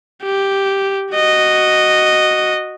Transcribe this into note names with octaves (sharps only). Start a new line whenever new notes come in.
G4
F#4 D#5